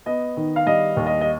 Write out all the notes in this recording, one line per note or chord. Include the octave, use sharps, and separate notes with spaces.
B3 D#5
D#3
F5
G3 D#5
D#2
D#5
D#5